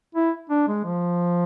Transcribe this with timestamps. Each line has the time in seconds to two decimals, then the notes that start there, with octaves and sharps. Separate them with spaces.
0.15 E4
0.50 D4
0.68 G#3
0.85 F3